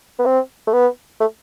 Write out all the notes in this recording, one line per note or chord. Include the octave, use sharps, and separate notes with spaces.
B3
C4
A3
B3
A3